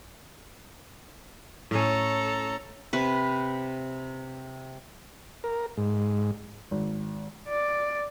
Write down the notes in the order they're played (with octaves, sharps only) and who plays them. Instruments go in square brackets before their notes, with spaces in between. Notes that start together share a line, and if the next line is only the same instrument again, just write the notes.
[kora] A2 C#4 [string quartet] A4 C#5 A#5
[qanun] C3 B4
[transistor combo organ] A#4
G#2
[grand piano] G#1
[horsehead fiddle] D5